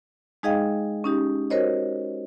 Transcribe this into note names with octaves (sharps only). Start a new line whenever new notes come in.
G#3 D#4 G#4 D#5 F5 G5
C#4 D#4 G4
F#4 A#4 C5 C#5 D#5